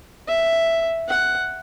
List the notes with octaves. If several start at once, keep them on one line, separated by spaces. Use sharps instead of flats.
E5
F#5